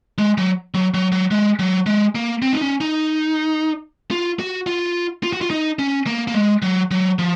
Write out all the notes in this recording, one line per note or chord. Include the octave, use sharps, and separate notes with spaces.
G#3
F#3
F#3
F#3
F#3
G#3
F#3
G#3
A#3
C4
D#4
C#4
D#4
F4
F#4
F4
F4
F#4
F4
D#4
C#4
A#3
A#3
G#3
F#3
F#3
F3